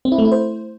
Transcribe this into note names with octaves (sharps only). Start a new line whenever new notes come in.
C4
E4
A3
E4
C5